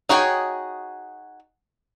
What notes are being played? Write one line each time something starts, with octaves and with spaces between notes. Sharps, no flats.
D#4 F#4 G#4 C#5 G5